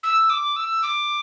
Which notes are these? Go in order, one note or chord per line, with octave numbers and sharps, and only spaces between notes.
E6
D6
E6
D6